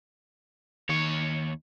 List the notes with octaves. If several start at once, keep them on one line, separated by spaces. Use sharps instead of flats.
D#2 D#3 C#5